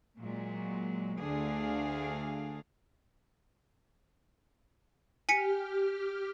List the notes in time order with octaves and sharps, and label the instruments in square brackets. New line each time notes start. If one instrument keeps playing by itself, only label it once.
[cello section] A#2 F#3 G#3
D2 D3 D4 G#4 F5
[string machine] G4 F6 [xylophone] G#5 B6 C#7